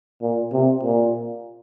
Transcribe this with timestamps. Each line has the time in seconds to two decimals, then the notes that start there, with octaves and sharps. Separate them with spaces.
0.22 A#2
0.53 C3
0.83 A#2